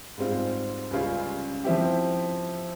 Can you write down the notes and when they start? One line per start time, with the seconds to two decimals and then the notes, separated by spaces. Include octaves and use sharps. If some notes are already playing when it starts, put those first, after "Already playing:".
0.18 G#2 G3 C4 F4
0.91 C#2 C#3 G3 C#4 F4
1.64 F3 C4 E4 G4